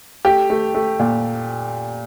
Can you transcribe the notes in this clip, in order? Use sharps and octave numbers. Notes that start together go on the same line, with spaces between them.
A3 G4
A3
A3
A#2